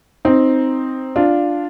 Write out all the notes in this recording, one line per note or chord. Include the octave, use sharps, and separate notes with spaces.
C4 D#4
D4 F4